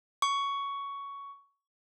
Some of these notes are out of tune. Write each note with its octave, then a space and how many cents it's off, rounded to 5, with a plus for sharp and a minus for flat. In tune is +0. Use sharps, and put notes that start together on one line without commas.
C#6 +10